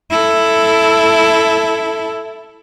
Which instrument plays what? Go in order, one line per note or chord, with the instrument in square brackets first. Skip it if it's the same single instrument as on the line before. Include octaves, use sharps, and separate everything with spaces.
[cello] E4 A4